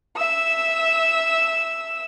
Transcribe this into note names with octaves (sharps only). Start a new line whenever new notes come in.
E5 E6